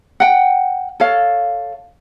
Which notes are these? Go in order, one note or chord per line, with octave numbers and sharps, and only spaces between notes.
F#5 G5
A4 C#5 F5